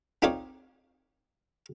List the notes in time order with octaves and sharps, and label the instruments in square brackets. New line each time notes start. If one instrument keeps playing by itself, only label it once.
[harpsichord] C4 D#4 F4 A#4 C#5 D5